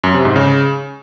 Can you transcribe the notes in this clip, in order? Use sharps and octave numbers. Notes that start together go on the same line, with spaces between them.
F#2
C3
G#2
C#3